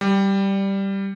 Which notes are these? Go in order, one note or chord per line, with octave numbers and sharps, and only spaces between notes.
G3